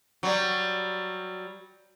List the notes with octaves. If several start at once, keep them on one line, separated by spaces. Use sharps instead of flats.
F#3 G3